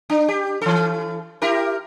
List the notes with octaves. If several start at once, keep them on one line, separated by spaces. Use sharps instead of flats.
D4
G4
E3 A4
E4 G4 A#4